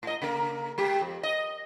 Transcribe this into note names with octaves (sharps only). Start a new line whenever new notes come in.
A2 D#5
C#3 A#3 A#4
G#3 G4
F2
D#5